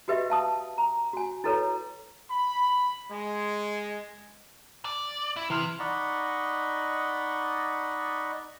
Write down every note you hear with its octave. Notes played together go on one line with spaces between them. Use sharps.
F#4 G4 B4 D#5 E5
F5 A5 D#6
A#5
F#4 G#5
E4 F#4 A4 B4 C#5 A#5
B5
G#3
D5
E4
C3 E3 C6 F6
D#4 D5 D#5 F#5 B5 C#6